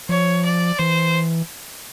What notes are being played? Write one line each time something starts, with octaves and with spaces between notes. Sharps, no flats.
F3 C#5
D5
E3 C5